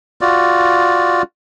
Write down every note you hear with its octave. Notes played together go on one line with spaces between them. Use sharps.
F4 F#4 D5